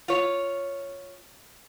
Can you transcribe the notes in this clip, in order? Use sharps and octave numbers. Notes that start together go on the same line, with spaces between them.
F4 C#5